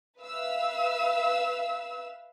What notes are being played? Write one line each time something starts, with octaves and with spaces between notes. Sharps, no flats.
B4 E5 F5 E6